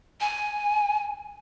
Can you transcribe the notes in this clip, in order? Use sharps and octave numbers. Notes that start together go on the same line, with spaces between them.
G#5